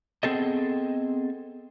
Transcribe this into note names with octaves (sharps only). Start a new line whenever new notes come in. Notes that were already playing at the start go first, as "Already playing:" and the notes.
B3 C4 G#4 A4 D#5